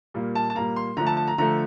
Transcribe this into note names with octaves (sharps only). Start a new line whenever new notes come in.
A#2 G3 A#3
A5
A5
A#2 G3 A#3 A#5
C6
D3 F3 A3 A#5
A5
A5
A#5
D3 F3 A3 A#5